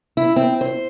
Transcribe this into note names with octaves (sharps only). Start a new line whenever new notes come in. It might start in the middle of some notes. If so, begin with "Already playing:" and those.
E4
C4
C5